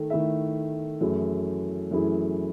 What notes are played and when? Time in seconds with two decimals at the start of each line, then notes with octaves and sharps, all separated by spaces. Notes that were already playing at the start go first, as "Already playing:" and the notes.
Already playing: D#3 A3 A4
0.10 D#3 A3 E4 A4 E5
1.01 F#2 E3 A3 E4 G#4
1.91 F#2 E3 A3 E4 G#4